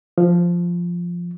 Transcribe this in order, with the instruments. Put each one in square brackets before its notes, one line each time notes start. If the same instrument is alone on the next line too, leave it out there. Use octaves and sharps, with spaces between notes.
[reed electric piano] F3